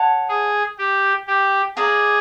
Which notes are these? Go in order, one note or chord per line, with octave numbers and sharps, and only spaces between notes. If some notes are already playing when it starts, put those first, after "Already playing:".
Already playing: C#5 F#5 A5
G#4
G4
G4
G#4 D5 F5 A#5